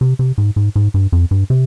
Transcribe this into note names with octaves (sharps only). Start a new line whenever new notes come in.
C3
C3
G#2
G#2
G#2
G2
F2
G2
C3